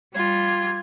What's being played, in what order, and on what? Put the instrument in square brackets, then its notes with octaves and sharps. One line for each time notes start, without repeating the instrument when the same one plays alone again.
[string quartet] G3 F4 [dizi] G#6